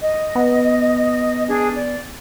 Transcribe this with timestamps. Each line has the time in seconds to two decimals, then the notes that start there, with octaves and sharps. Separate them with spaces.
0.02 D#5
0.35 B3
1.48 D4 G#4
1.75 D5